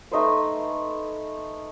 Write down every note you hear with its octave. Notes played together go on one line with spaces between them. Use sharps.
A3 D#4 B4 C5